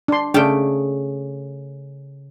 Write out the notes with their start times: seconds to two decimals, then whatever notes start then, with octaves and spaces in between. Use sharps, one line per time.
0.08 D4 C6
0.34 C#3 A3 D4 G5